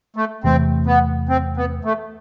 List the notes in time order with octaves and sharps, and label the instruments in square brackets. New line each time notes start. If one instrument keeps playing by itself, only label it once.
[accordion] A3
[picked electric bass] E2 C3 E3 A3 [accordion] C4
[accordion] B3
C4
B3
A3